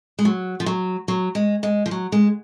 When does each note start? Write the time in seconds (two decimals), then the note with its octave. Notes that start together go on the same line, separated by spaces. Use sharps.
0.19 G#3
0.25 F#3
0.60 F3
0.66 F#3
1.08 F#3
1.35 G#3
1.63 G#3
1.86 F3
1.91 F#3
2.12 G#3